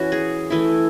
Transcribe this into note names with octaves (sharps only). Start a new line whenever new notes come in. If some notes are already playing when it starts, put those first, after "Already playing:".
Already playing: E3 C#4 F#4
G#4
E3 A3 E4